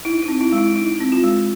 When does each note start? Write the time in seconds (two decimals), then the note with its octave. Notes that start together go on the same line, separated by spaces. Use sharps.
0.05 D#4 E4
0.23 D#4
0.28 C4
0.41 E4
0.52 G#3
0.58 E4
0.76 D#4 E4
1.00 C4
1.12 F4
1.24 G#3